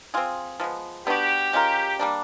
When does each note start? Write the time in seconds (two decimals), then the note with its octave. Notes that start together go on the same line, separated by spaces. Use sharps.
0.14 C4 F4 G#4
0.60 F3 G#3 B3
1.07 B3 D4 F#4 G4
1.53 G#3 C#4 F4 A#4
1.99 G3 A#3 D4